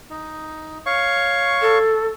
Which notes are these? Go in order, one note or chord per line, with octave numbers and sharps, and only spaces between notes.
D#4
C#5 F5 C#6
A4